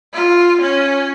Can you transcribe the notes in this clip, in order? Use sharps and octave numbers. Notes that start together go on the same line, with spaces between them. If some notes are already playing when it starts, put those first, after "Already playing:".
F4
C#4